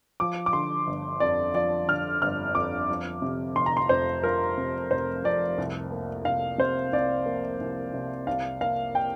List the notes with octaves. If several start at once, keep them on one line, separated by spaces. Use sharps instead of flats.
F3 D6
D6
D3 C6
G1
F2 D5
F3 D5
D3 F6
G1 F6
F2 D6
F3
C3
F1 C6
A#5
C6
F2 C5
F3 A#4
C3
F1 C5
F2 D5
C2
A#3
C2 F5
C3 C5
C2 D5
A#3
C2
C3
C2 F5
A#3 F5
G5